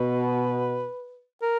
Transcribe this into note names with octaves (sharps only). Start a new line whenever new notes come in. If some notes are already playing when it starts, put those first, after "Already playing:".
Already playing: B2 B4
A#4